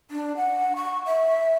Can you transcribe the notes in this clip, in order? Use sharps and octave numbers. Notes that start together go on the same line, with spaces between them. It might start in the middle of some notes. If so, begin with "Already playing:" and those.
D4
F#5
C#6
E5